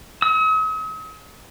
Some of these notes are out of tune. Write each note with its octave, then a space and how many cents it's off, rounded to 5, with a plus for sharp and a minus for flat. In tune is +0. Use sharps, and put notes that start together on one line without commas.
D#6 +45